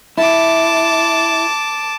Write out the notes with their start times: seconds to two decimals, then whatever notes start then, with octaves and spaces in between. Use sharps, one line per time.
0.18 E4 A5 D6